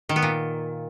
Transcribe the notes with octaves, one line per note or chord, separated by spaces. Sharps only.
D#3
B3
A#2